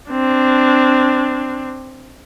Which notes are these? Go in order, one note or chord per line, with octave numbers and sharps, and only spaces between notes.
C4 D4